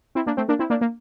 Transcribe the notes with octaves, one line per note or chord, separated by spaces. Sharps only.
C4 E4
A#3 D4
A3 C4
A#3 D4
C4 E4
A#3 D4
A#3